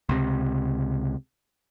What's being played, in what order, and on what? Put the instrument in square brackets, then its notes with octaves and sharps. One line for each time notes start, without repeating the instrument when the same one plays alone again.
[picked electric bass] C#2 C3